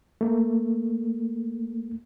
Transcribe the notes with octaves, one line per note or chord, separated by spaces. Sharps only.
A3 A#3